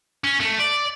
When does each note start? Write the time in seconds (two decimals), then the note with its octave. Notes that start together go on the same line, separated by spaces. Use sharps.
0.24 C#4
0.40 A3
0.59 D5